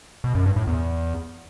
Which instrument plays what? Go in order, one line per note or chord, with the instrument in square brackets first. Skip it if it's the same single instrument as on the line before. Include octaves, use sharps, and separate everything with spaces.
[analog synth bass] B2
F#2
G2
A2
E2